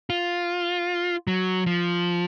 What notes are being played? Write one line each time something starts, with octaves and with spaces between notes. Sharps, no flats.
F4
F#3
F3